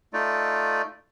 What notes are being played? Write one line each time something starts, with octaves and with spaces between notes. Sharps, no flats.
A3 D#4 F4 D5